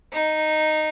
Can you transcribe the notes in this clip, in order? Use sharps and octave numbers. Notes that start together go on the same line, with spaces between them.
D#4